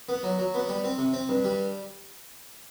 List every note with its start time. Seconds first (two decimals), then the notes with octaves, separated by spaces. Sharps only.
0.09 B3
0.23 F#3
0.39 F#3
0.54 B3
0.69 G3
0.84 C4
0.98 C3
1.13 C4
1.29 G2
1.44 G3